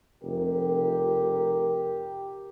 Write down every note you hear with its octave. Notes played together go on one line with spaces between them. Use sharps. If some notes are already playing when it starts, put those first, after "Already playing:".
F1 G4 A#4